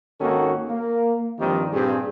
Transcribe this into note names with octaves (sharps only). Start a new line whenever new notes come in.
G#1 D#3 A#3 C#4 F#4 A4
A#3
G2 D#3 F3 G3 C4 G4
G2 A#2 C4 G4 G#4